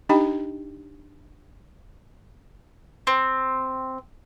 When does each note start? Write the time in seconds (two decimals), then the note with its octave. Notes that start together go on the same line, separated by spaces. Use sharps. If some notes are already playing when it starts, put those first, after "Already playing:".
0.09 D4 D#4 G4 D#5 G5 B5
3.07 C4